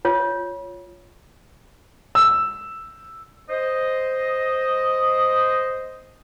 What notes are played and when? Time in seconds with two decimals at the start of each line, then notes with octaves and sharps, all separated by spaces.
0.05 F4 C#5
2.15 E6
3.50 C5 D#5